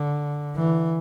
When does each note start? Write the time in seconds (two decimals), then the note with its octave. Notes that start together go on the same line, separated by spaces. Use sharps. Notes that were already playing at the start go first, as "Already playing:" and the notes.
Already playing: D3
0.56 E3